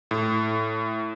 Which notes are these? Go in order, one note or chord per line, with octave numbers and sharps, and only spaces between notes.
A2